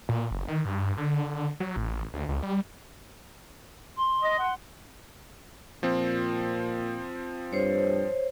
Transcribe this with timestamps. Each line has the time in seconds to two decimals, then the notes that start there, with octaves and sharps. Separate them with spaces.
0.09 A#2
0.31 F#1
0.48 D#3
0.65 G2
0.97 D3
1.60 F#3
1.76 A1
2.14 D2
2.29 C#2
2.43 G3
3.96 C6
4.22 D#5
4.39 F#5
5.83 A#2 F3 C4
7.53 G2 C5 C#5